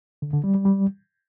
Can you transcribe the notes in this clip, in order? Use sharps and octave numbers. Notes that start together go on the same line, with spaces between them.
D3
D3
G3
G3
G3